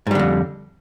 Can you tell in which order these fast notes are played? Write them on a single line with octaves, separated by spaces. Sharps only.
G#2 G3 D3 F2